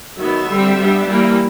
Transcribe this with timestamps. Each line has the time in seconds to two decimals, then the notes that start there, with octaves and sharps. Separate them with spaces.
0.18 D#3 F#3 B3 E5
0.48 D3 G3 C4
0.78 G3 B3 D4
1.07 E3 G3 A#3